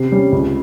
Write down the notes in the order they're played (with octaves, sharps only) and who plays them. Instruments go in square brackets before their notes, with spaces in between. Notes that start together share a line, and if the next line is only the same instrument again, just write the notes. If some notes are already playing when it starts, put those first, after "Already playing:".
Already playing: [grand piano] C3 C7
G3 C#4
C#2